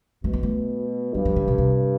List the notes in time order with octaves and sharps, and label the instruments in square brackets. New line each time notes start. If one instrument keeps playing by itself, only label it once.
[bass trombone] B2 [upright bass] A3
[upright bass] B3
A3
[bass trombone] G2 [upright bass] G3
[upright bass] F3
D3
B2
C3